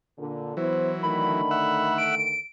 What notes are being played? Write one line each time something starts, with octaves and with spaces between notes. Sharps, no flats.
A#2 D3
E3 F#3 B3 E4 C5
D3 D#3 A3 B5
E5 F#5
D7